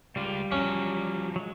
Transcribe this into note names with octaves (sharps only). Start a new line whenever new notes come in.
C#2 G3 F4
F3 F#3 C#4
F#3 G#3